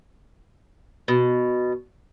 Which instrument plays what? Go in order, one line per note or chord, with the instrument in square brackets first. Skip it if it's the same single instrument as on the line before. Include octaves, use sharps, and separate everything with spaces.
[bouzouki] B2